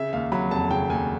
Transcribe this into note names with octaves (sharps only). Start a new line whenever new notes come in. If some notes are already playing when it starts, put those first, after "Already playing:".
Already playing: C#3 E5
D#2 F5
F#3 B5
F1 A5
C#3 G5
D#2 G#5